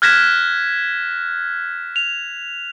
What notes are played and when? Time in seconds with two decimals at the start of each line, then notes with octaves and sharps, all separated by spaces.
0.02 F6 F#6 G#6 A#6 B6 E7
1.96 F7